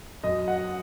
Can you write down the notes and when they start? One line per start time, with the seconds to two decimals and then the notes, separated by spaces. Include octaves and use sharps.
0.24 F#2 D#5
0.48 F#5